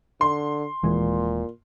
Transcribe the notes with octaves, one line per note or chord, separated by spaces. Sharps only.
D3 C6
D#1 A#2 E3 G#3